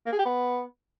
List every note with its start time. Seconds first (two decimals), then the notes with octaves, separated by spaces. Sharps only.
0.06 A#3
0.12 G#4
0.19 G4
0.25 B3